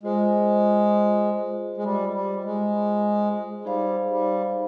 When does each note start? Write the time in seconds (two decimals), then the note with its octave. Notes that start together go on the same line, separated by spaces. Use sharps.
0.03 G#3 F4 C5 D#5
1.77 G#3
1.84 G3
2.14 G3
2.44 G#3
3.65 G3 D#4 G#4 C5 F5
4.11 G3